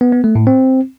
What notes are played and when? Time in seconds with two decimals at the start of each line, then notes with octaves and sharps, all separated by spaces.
0.01 B3
0.12 B3
0.24 A3
0.35 A2
0.47 C4